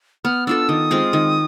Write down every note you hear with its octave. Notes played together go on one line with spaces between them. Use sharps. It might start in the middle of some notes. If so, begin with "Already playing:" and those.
B3 F6
D4 F4 A4 E6
D#3 D#6
G#3 C4 F4
D#3